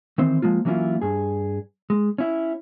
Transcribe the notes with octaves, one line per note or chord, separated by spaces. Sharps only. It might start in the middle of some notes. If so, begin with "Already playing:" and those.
D#3 E3 C4 C5
F3 G#3 A#3 F4
E3 F#3 A#3 C#4 E4 F4
G2 G#4
G#3
C#4 E4